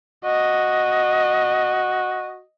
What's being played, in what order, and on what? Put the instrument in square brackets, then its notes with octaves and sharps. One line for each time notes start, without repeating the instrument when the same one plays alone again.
[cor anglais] F#4 [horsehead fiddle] D#5